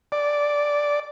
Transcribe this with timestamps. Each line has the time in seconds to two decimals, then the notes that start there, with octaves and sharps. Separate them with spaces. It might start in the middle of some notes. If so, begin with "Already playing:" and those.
0.12 D5